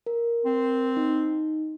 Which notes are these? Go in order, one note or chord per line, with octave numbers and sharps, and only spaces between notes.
A#4
C4
D#4